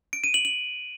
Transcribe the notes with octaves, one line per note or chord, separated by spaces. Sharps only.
D7
D#7
F#7
F#7